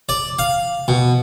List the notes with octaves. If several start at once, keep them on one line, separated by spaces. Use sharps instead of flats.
D5
F5
B2